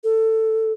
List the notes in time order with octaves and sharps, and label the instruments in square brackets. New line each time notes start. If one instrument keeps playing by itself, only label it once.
[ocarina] A4